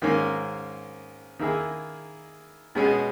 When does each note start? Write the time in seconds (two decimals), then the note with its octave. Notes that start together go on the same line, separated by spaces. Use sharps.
0.02 G#2 D#3 A#3 C#4
1.39 D#3 A#3 E4 G#4
2.75 B2 G#3 C#4 G#4